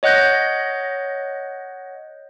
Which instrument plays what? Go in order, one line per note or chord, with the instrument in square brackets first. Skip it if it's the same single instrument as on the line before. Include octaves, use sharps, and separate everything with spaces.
[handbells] C#5 D#5 F#5 F#6 G6 A#6